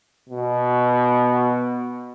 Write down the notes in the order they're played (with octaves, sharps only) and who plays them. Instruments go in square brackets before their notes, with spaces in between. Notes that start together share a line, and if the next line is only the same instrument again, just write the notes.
[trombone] B2